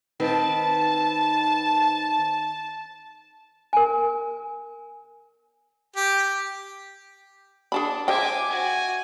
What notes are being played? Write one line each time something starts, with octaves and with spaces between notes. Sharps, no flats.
D#3 C4 B4 A5
A#4 G#5
G4
D4 G#4 A5 B5
C5 D#5 E5 G5 G#5 D6
F#4 G#5